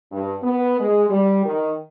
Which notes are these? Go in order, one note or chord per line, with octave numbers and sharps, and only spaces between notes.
G2
B3
G#3
G3
D#3